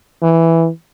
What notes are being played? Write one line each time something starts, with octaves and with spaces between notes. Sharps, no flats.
E3